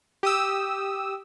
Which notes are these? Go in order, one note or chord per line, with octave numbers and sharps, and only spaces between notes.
G4 D#6 E6